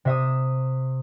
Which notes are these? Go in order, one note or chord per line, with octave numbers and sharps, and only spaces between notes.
C3 E5 D#6